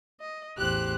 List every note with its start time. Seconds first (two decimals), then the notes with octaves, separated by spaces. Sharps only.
0.20 D#5
0.58 A1 E2 G4 C5 F#6